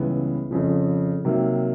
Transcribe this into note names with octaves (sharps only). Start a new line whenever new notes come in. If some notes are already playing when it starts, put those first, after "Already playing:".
Already playing: C#2 C#3 E3 G3 B3
F2 C#3 F3
C3 D#3 F#3 A#3